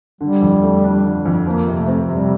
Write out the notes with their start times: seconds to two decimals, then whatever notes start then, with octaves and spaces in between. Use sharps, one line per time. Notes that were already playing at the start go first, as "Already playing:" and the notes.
0.21 D3 G3
0.42 F2
0.62 A3
0.84 D4
1.05 D3
1.25 F2
1.46 F3 A#3
1.67 C3
1.78 A3
1.88 C4
2.08 C3 G3